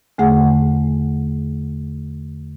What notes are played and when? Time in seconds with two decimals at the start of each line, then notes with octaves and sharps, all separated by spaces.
0.18 E2 D3 A3 G#4 F#5